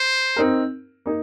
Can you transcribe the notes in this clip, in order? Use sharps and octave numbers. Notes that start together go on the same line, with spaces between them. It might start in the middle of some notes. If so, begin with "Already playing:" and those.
Already playing: C5
C4 D#4 A#4
A#3 D#4